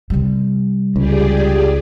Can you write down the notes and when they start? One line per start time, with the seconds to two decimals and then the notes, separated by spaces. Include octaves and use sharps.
0.10 C3 G3
0.96 C#2 G4 G#4 D5